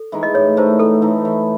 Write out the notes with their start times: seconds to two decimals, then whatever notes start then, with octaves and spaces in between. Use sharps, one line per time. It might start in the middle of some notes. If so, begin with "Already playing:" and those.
Already playing: A4
0.12 E3 G#3 D#4
0.23 D#5
0.35 A2 C#5
0.57 E3 A3 D#4 C5
0.79 A2 A4
1.02 E3 A3 D#4
1.25 E3